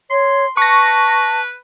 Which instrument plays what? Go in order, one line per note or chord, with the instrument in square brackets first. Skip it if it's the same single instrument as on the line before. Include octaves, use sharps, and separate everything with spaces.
[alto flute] C#5 [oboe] C6
[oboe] B4 [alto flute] A5 [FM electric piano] C#6 A#6